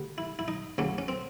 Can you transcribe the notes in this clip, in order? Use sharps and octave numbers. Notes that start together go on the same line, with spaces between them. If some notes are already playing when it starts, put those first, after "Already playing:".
Already playing: D2 D3 G3
E4
E4
D#4
D2 C#3 F#3 C#4
C#4
C4